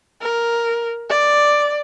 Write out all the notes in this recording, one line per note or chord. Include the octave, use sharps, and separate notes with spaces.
A#4
D5